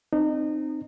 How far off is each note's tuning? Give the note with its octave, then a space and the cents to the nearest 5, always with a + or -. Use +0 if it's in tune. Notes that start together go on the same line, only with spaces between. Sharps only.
C4 +0 D#4 -25